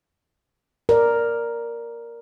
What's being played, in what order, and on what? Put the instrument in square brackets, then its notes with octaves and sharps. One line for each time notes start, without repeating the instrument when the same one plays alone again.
[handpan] A#4 D5